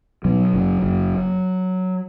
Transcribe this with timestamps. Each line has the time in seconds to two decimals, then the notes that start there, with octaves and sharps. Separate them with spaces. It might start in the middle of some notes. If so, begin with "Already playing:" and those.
0.25 B2 F#3
0.53 F#1
0.82 F#1